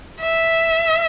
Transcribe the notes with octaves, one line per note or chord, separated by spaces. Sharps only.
E5